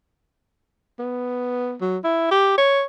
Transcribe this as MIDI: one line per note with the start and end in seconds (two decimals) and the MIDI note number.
0.99 1.75 59
1.82 1.97 54
2.04 2.27 64
2.31 2.56 67
2.58 2.83 73